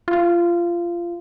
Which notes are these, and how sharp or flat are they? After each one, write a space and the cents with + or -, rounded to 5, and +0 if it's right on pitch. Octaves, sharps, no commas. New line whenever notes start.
F4 -20